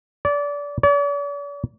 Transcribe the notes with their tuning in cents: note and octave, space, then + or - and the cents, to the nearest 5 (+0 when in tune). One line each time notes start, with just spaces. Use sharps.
D5 -25
D5 -45